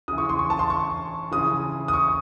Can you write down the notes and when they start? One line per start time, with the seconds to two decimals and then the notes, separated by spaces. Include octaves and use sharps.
0.08 C#3 E3 D#6
0.18 C#6
0.29 C6
0.39 C#6
0.50 A5
0.59 C6
0.70 C#6
1.32 C#3 E3 D#6
1.88 D#6
1.93 C#6